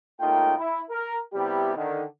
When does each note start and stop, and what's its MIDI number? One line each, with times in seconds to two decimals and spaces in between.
0.20 0.53 37
0.20 0.53 57
0.20 0.53 58
0.20 0.53 63
0.20 0.53 65
0.20 0.53 79
0.58 0.81 64
0.90 1.17 70
1.34 1.74 48
1.34 1.74 55
1.34 1.74 59
1.34 1.74 64
1.34 1.74 67
1.75 2.03 50
1.75 2.03 51